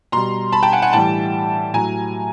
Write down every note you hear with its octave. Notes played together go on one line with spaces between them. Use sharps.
B2 G3 A#5 C6
A5 B5
G5 A5
F#5 G#5
F#5 G#5
A2 E3 G3 G5 A5
A2 F#3 G#5 A#5